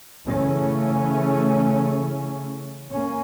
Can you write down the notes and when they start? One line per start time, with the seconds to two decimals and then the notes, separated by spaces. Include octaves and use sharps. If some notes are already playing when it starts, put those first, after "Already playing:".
0.25 C#3 E3 A3 C#4
2.93 A#3 C#4